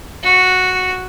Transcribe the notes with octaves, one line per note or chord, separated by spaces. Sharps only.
F#4